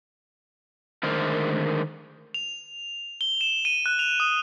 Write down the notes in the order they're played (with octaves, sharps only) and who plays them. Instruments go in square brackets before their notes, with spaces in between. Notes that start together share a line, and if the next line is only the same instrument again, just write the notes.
[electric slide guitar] D3 D#3 G#3 A3 A#4 C5
[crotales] F7
G7
E7
D#7
F#6
F7
D#6